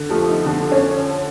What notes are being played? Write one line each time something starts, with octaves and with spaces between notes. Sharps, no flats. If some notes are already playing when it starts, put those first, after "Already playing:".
Already playing: D3
F3 A3 G4
D#4
D3 D4
C#4